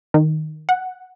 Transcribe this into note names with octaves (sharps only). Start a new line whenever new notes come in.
D#3
F#5